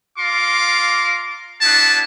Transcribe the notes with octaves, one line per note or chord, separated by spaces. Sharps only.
F4 F5 A#5 C6 D6
B3 D4 E4 F#4 A5